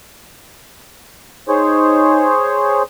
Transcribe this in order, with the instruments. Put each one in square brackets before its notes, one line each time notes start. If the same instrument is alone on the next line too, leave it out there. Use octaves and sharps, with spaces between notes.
[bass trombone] D#4 [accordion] G#4 C5 C#5